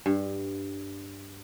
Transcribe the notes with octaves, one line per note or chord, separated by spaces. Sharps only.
G2